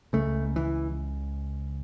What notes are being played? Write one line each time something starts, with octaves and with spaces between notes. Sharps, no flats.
C#2 C#3 A3
E3